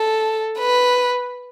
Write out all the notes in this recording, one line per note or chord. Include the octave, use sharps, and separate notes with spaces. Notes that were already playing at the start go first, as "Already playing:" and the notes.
Already playing: A4
B4